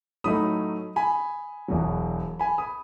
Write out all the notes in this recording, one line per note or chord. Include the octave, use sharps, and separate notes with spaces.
A2 F#3 A3 D#4 B5 D#6
G#5 B5
E1 E2 B2 F#3
G#5 B5
B5 D#6